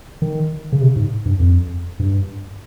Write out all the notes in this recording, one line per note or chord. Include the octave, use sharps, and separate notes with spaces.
D#3
C#3
C3
G#2
G2
F2
G2